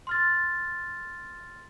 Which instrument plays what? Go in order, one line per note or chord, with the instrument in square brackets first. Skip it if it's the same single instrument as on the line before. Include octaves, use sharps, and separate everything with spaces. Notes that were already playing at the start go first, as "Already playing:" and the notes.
[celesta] C6 F6 A6